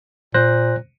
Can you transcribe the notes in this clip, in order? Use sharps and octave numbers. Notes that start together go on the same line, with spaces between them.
A#2 C5 F#6 A#6